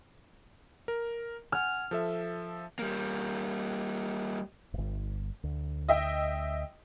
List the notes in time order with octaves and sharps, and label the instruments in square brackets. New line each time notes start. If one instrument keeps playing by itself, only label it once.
[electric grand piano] A#4
[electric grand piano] F#5 G#5 [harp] F6
[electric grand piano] F3 A4 E5
[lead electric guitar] G3 A#3
[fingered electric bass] D1 G1
D2
[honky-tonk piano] D#5 E5 G5